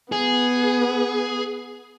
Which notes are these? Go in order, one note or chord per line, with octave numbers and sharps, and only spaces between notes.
B3 G#4